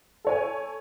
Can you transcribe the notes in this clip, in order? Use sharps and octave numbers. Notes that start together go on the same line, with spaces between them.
A4 C#5 G#5